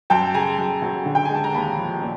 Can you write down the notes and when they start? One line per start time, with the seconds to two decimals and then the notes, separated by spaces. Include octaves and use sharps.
0.10 F#2 G5 A5
0.34 C#3 G#5 A#5
0.58 F#2
0.82 F#3
1.06 D3
1.15 G5
1.25 G#5
1.30 G#3 A5
1.44 A#5
1.53 D#2 A5 B5
1.78 F3
2.02 A#2